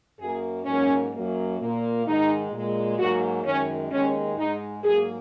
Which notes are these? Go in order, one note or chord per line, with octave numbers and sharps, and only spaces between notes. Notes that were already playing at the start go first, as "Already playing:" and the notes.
F#2 F#3 A#3 G#4
G#2 F#3 A#3 C#4
F#2 F#3 A#3
A#2 A#3
G#2 D#3 G#3 D#4
A#2 G#3
G#2 F#3 A#3 F#4
F#2 D#3 G#3 C#4
D#2 D#3 G#3 C#4
G#2 G#3 D#4
G#2 F#3 A#3 G#4